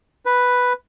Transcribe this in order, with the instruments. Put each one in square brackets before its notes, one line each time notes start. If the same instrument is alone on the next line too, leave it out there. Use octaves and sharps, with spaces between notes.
[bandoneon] B4